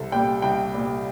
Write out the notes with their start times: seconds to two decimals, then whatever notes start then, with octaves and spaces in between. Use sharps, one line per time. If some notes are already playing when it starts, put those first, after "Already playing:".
Already playing: C2 A4
0.12 A#2 G3 G5
0.42 C2 G5
0.74 A#2 G3